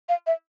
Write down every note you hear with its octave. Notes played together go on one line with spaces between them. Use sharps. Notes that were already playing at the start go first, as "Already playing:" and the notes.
F5
E5